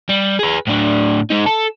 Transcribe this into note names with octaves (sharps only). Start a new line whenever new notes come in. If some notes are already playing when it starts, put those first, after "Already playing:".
G3
G#4 B4
A2 D4
G#3 D#4
A4